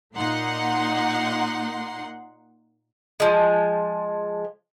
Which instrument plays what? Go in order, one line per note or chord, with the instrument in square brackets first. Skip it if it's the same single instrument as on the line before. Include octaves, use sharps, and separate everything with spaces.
[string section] A#2 A#3 D#4 F#5 C6
[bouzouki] F3 G#3